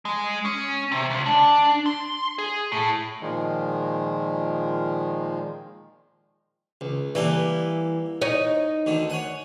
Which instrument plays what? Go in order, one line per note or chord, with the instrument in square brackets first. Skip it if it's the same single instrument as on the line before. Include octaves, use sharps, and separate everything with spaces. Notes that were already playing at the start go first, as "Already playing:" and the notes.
[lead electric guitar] G#3
C#4
C3
C#2
D4
C6
G#4
A2
[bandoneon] A#2 D#3 F3 G#3
[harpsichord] C#2
[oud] E3 [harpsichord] G3 A#3 A4
[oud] D#4 C#5 D#5
[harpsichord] D2 D3 D#3
C#5 F#5 G#5